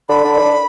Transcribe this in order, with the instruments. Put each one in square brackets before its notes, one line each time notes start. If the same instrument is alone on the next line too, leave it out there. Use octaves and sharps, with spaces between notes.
[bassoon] D3 [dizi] B5
[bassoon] D3
D4